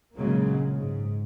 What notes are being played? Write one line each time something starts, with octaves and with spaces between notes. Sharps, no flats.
A#1 C#3 F#3 G#3 A#3
G#2